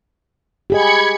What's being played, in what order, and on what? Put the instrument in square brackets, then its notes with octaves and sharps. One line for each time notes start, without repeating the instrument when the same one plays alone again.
[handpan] G4 G#4 D#5 [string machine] B5 G#6 C#7